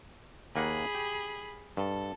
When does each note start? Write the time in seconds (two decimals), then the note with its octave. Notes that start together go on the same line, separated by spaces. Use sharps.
0.56 D#2 A#3 G#4 F#5 B5
0.95 G4
1.77 G2 A4